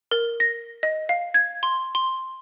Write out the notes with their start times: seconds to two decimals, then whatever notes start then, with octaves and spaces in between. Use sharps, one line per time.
0.11 A#4
0.40 A#6
0.83 D#5
1.09 F5
1.34 G#6
1.63 C6
1.95 C6